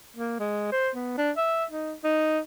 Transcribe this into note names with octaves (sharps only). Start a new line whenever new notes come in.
A#3
G#3
C5
B3
D4
E5
D#4
D#4